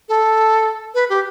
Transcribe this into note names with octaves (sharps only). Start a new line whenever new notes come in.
A4
B4
G4